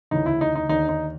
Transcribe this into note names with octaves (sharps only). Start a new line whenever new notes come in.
D2 C#3 E3 D#4
E4
D#4
D#4
D#2 D3 D#4
D#4